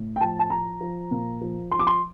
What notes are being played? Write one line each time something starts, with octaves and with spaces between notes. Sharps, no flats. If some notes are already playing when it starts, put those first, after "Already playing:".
Already playing: A2
G5
F3 A5
A5
F3 A#5
F3
A#2
F3
F3 C6
D6
C6